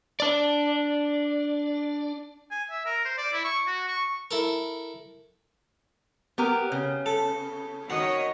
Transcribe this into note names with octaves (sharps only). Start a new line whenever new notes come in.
D4 D5
G#5
E5
A#4
C5
D5
E4
C#6
F#4
C#6
E4 A4 A#4
B3 G4 A#4
C#3
A4
D#3 F#4 C#5 D#5